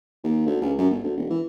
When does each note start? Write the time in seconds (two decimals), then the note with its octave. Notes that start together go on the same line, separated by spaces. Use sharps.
0.24 D#2
0.46 D2
0.62 C#2
0.78 F#2
0.91 G1
1.03 D2
1.17 E1
1.30 E3